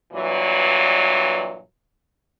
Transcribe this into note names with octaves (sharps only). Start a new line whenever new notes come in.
G2 A#2 E3 F#3